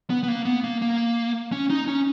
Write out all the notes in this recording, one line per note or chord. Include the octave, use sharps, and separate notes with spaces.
B3
B3
A#3
B3
A#3
A#3
C#4
D#4
C#4